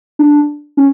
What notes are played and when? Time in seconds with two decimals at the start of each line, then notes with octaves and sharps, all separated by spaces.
0.19 D4
0.77 C#4